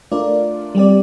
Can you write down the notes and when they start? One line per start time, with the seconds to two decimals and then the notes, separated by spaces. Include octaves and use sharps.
0.12 A3 D4 F4 A#4 D5
0.75 G3 C4 G4 D5